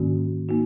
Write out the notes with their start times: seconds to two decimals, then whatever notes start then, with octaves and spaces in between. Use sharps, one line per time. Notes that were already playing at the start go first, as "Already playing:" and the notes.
Already playing: G#2 D#3 A#3 C#4 F#4
0.49 A#3 D#4 F#4